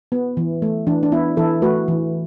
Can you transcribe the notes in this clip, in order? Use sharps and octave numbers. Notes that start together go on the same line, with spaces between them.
B3
E3
A3
E3 D4
D4
B3 E4
E3 E4 A4
A3 F#4 B4
E3